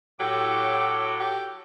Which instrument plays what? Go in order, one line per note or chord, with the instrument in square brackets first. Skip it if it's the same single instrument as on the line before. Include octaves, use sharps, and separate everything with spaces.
[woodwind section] A2 D6 [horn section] F#3 A4 [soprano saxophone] G4
[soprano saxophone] G4